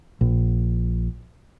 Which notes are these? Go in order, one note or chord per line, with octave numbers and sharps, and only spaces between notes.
A#1